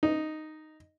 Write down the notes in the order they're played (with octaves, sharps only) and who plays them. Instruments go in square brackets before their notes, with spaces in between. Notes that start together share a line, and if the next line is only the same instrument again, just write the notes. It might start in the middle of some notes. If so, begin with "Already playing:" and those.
[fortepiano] D#4